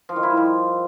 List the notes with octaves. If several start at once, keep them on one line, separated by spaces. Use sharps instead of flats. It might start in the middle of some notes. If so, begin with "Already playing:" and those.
F3
D#3
E4
G3
F3